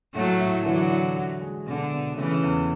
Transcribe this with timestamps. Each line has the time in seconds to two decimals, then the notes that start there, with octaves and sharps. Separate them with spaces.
0.14 A2 F#3 A3
0.40 A2
0.65 D3 E3 F#3
0.91 E3
1.16 F#4
1.41 G#3
1.66 B2 D3
1.92 B2
2.17 C#3 E3 A3
2.43 E2